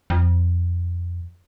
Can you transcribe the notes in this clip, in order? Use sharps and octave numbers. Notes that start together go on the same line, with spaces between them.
F2